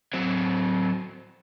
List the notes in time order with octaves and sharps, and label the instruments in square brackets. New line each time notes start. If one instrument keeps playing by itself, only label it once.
[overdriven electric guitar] F#3 C4